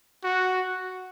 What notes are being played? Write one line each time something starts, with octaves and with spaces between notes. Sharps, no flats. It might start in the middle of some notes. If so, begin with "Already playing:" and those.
F#4